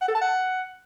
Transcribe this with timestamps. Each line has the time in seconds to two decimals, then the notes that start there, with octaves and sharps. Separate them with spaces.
0.02 F#5
0.08 A4
0.15 A5
0.21 F#5